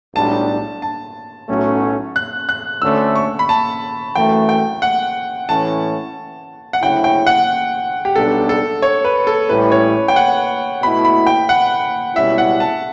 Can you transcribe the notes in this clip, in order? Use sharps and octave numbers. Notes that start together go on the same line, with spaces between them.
B1 A2 G3 D4 A5
A5
B1 A2 F#3 A3 C#4
F#6
F#6
D2 D3 A3 C#4 E6
C#6
B5
A5
F#2 E3 A3 G5
G5
F#5
A2 E3 A3 C#4 A5
F#5
D2 C#3 F#3 C#4 E4 G5
G5
F#5
G4
B1 B2 G3 B3 D4 A4
A4
C#5
B4
A4
A1 A2 G3 C#4 E4 B4
C#5
G5
F#5
B2 A3 E4 B5
B5
G5
F#5
C#2 B2 G3 C#4 E4 E5
F#5
A5